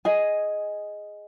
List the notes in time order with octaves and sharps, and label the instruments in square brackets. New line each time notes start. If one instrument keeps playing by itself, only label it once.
[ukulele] G#4 D#5 G#5